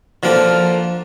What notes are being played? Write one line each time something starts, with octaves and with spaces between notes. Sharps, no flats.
D3 F3 A#3 F4